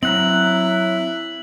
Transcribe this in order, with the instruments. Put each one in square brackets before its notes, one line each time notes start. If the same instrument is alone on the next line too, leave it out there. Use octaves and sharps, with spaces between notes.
[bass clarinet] F#3 [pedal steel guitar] C4 F#5 A#5 [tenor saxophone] E4 [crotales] F#7